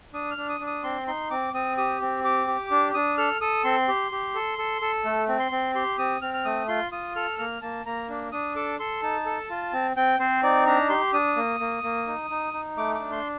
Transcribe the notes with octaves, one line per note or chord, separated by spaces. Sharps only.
D4 D#6
F6
D4
D#6
D4
D#6
C4 C6
D#4 C6
C4 D6
C4 D#6
G4 D#6
C4
G4 D6
G4
D4
D4 D#6
A4 F6
A4 D#6
C4 C6
G4
G4
A4
A4
A4
A3
C4
C6
C4
G4 C6
C4 D#6
C4 F6
F6
A3 D#6
F4 C6
F4 D#6
A4 F6
A#3 F6
A#3 A5
A#3 A#5
D4
D4 D#6
A4 D6
A4 C6
D#4 A5
A4
F4
C4
C4 G5
C4 C5
D#4 D5
D4 A#5
G4 C6
D4 D#6
A#3
A#3
A#3
D#4
D#4
D#4
A3 D6
D6
D4
C6